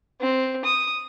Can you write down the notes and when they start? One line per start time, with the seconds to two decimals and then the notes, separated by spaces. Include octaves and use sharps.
0.20 C4
0.64 D#6